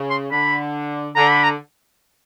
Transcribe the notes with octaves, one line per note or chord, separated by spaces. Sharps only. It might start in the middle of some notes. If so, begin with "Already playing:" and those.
Already playing: C#3
C6
D3 B5
D3 A#5
B5
A#5